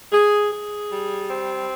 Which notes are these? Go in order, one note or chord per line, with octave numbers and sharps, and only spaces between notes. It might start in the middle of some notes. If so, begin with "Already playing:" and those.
G#4
G#4
G3
C4